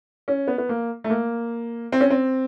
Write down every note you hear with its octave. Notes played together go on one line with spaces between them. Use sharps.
C#4
B3
B3
A#3
A3
A#3
C4
C#4
C4